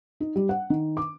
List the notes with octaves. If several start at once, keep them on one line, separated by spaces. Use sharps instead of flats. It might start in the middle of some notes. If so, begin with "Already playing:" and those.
D#4
G3
F#5
D#3
D6